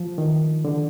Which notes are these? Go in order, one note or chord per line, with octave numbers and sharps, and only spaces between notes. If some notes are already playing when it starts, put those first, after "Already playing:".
Already playing: F3
D#3
D3